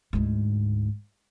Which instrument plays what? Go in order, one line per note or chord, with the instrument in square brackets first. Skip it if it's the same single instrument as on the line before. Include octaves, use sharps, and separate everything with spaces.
[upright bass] D2 G#2